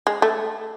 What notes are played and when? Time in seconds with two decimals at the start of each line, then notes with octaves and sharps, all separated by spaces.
0.07 G#3
0.22 A3